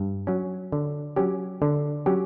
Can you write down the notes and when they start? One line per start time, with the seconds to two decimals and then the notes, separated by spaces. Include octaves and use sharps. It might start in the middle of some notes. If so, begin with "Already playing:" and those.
Already playing: G2
0.27 F#3 C#4
0.72 D3
1.16 F#3 C#4 G4
1.62 D3
2.06 F#3 C#4 G4